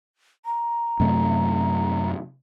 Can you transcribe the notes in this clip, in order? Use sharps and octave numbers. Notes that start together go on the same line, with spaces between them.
A#5
F#2 C3 A3